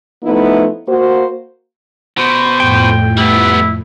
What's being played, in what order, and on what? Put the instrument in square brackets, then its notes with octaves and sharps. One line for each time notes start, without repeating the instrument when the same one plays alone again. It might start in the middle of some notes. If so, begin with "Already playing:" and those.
[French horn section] F3 A3 B3 D#4 E4
A#3 F#4 C5
[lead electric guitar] B2 [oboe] C5
[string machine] F2 A2 [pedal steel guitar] G5
[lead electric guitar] G3 B3 [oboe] E4